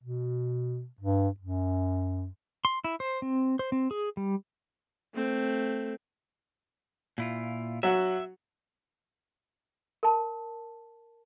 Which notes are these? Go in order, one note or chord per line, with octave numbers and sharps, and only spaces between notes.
B2
G2
F#2
C6
E4
C5
C4
C5
C4
G#4
G3
A3 C4
A#2 E4 F4
F#3 F#4 E5
A#4 A5